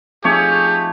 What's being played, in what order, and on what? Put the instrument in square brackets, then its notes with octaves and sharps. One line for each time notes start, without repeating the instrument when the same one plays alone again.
[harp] F3 C4 D#4 [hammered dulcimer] A3 C#5 [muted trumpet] G4 [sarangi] G#4